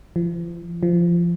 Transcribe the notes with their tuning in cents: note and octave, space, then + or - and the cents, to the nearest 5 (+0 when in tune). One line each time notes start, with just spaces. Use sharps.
F3 -40
F3 -20